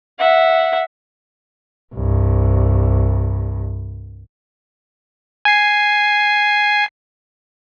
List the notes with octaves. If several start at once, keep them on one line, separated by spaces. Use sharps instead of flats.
E5 F#5
C2 G2
G#5 C7